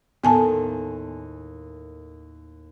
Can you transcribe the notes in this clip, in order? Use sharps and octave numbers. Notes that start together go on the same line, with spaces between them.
D#2 A2 B3 G#5 A5 C6